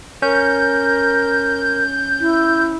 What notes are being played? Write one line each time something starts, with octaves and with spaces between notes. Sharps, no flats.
C#4 A#4 G6
E4